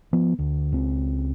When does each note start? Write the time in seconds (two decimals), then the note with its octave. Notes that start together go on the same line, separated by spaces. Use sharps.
0.13 F3 B3
0.39 D2
0.72 C#2 C4